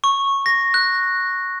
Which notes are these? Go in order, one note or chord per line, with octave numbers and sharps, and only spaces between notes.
C#6
A#6
F#6